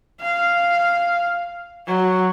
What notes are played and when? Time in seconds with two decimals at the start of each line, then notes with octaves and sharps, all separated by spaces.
0.21 F5
1.87 F#3